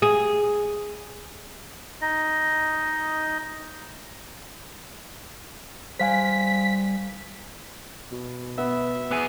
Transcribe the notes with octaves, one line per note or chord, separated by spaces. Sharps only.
G#4
D#4 D#5
G3 C5 F5 G#5 B6
B2
B3 E5
B3 G#4